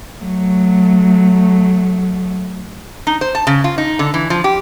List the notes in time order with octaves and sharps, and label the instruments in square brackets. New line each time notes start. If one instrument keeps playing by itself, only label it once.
[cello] F#3 A3
[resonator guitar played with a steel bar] D#4
C5
A5
C#3
F4
D#4
D3
E3
F3
G4